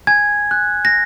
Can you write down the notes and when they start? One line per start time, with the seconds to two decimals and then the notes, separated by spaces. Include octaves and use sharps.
0.07 G#5 G#6
0.51 F#6
0.85 A#6